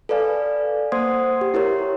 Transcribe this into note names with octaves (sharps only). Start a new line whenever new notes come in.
A4 B4 D5 F5 G#5
A#3 C5 F#5 C6 D#6 G#6
G4
E4 G4 A#4 C#5